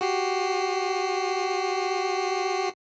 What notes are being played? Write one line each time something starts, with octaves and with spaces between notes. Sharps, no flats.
F#4 G4 C7